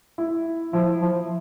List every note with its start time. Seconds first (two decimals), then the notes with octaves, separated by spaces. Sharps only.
0.18 E4
0.73 F3 E4
1.02 F3